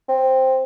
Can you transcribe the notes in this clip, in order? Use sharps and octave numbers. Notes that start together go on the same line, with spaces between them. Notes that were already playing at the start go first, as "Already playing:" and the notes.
C4